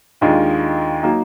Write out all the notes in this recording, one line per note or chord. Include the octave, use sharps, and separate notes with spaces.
D#2 D#3 G#3 D4 F4
F#3 A#3 D#4